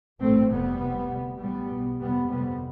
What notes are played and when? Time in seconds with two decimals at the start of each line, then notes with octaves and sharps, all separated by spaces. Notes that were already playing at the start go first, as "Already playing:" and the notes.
0.21 A1 G2 A3 C4
0.51 F1 F2 C3 G3 B3
0.81 C2 C3
1.11 D2 C3
1.40 A1 A2 G3 B3
1.70 B1 B2
2.00 G1 F2 C3 G3 B3
2.30 G1 F2 C3 G3 B3